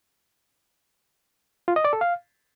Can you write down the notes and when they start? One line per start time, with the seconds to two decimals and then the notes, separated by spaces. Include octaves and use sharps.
1.68 F4
1.76 D#5
1.85 D5
1.93 A4
2.01 F5